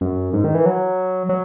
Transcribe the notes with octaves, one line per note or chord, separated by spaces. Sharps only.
F#2
G#2
D#3
E3
F#3
F#3